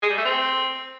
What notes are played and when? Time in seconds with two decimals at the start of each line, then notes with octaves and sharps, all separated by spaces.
0.03 G#4
0.10 G3
0.18 A3
0.25 C4